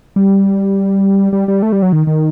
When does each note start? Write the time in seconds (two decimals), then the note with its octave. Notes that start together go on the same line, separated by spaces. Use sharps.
0.16 G3
1.33 G3
1.48 G3
1.63 A3
1.72 G3
1.82 F#3
1.93 D#3
2.07 D#3